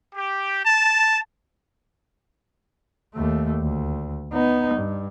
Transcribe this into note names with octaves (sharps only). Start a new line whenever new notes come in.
G4
A5
D#2 A3
D2
B3 D#4
G2